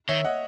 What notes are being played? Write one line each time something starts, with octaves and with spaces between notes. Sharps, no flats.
D#3 C#5 E5
D#5 F#5